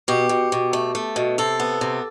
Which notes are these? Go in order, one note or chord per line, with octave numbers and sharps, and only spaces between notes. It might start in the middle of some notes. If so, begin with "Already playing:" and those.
B2 G4
B2
B2
A3
A3
B2
C3 A4
B3
C3